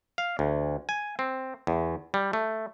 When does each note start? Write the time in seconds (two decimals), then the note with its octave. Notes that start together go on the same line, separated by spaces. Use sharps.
0.18 F5
0.39 D2
0.89 G#5
1.19 C4
1.67 E2
2.14 G3
2.33 A3